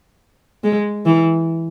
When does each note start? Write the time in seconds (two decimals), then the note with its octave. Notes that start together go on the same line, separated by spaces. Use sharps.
0.64 G#3
1.06 E3